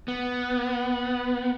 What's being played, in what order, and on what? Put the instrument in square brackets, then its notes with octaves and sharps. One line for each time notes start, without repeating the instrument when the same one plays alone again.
[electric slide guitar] B3